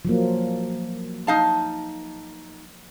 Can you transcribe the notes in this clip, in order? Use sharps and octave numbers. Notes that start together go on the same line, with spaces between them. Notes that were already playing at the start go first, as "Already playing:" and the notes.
F3 F#3 A#3
D#4 F5 A5